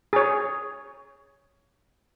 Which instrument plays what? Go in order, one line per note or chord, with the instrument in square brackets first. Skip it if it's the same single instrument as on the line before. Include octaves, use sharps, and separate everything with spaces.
[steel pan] G#4 C#5